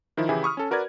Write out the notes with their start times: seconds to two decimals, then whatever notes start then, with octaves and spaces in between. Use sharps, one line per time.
0.17 D#3 F3 E4
0.29 C#3 E3 E4 G4 G#4
0.43 B5 C#6 D#6 F6
0.57 C#4 A4
0.71 F#4 A#4 B4 D5 G#6